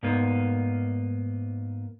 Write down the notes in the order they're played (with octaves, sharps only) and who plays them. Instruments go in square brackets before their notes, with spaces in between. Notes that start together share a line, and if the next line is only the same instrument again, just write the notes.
[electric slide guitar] G#2 A#3 B3